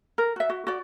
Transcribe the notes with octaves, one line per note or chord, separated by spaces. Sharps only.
A#4
F#4 E5
F#4
F#4 D5